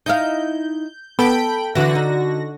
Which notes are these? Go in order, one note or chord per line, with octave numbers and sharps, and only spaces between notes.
D#4 E4 F5 G6
B3 A4 G5 B5 D7
D3 E3 F#4 A#6
D#4